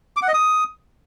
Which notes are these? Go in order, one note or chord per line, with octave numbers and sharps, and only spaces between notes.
D6
F#5
D#5
D#6